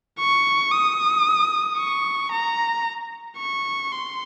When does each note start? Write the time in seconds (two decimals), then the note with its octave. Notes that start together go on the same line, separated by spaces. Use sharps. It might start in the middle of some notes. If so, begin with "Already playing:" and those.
0.18 C#6
0.71 D#6
1.78 C#6
2.31 A#5
3.38 C#6
3.92 C6